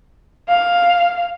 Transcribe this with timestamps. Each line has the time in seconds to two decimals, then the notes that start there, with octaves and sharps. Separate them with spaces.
0.49 F5